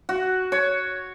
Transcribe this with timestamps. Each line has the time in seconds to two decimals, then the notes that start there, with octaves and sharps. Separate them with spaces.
0.09 F#4
0.52 C#5